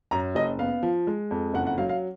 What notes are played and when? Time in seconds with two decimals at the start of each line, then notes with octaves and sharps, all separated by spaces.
0.11 F#2 A#5
0.35 F#1 D#5
0.59 B3 F5
0.83 F3
1.07 G#3
1.31 F2
1.54 F#1 F#5
1.67 F#5
1.78 F#3 F5
1.89 F5